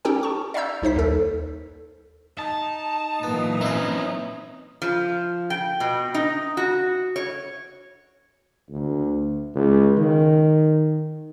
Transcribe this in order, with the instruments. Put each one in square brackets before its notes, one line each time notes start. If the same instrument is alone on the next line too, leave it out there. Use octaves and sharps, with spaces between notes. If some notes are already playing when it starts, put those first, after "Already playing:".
[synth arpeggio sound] C#4 D#4 G4 A4 G5
A5 C#6
D5 E5 F5 A#5 E6 G6
C2 D#4 C5 B6
D#2 A4
[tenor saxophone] D#4 [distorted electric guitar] A5
[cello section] A#2 E3 F#3 [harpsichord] B3
[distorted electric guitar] C4 C#4 [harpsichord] E4 B4
[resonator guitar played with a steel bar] F3
G5
B2
D#4
F#4
C#5
[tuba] D2
C#2
D#3